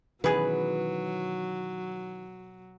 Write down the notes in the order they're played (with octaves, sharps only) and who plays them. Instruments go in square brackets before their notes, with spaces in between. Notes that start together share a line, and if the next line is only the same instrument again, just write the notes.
[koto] B2 G#4 [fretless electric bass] D#3 E3 C#4 [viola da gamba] F#3 [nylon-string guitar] B4